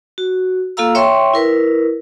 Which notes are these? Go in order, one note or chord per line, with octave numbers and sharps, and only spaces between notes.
F#4
A#3 F4 A4 F5 A#5 E6
C#5 E5 G5 C6 C#6
E4 A#4 B4